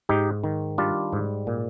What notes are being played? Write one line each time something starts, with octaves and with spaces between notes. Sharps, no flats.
G#2 D#4 G4
D#3
G3 D4 F4
G#2
A#2